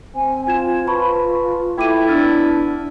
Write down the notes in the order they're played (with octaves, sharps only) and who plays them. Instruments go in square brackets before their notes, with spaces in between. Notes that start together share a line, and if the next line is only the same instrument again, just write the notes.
[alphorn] C4 [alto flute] G#5
[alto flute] F4 [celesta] G#5 G#6 E7
[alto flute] F4 [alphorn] B4 [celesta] A5 B5 C#6
[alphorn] A3 [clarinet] E4 [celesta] G5 D6 D#7
[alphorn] B3 [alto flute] D4 [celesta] E6 F6 A6